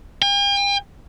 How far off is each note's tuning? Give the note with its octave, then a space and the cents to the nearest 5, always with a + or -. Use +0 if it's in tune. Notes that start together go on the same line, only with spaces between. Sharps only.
G5 +45